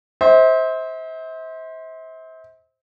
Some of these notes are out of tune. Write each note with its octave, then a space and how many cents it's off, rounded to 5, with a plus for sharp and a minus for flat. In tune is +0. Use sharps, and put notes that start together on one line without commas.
C5 +5 E5 -40